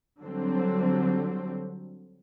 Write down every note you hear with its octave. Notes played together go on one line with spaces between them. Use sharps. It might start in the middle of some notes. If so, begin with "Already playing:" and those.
D3 F#3 G3 C4